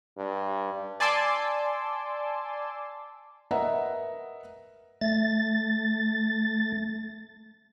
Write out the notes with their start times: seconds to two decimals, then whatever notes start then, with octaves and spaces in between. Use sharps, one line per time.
0.17 G2
1.00 D5 G#5 A5 C6 D6 E6
3.51 A#4 B4 D#5 E5 F#5 A#5
5.01 A3 A6